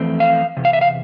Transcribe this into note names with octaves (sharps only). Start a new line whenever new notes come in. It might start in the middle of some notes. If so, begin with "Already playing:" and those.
Already playing: F2 E3 A3 C4
F5
E2 C3
F5
E5
F5